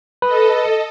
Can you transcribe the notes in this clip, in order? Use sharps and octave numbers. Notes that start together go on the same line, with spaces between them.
A4 B4 D#5